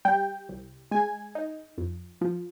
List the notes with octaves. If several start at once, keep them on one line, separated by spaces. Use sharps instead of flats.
G3 G5
C2
G#3 G#5
D#4
F2
F3